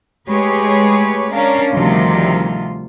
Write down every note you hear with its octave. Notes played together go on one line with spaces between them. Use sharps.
G#3 A3 G4 G#4 B4 C#5
C#4 D4 A#4 F5
D2 C3 D#3 F3 G3 F4